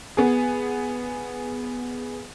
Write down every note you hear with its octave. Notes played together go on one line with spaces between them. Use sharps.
B3 G#4